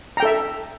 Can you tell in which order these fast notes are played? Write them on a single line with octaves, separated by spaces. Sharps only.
A#5 G5 A4 E5